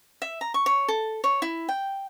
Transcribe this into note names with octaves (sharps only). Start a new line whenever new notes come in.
E5
A#5
C#6
C#5
A4
C#5
E4
G5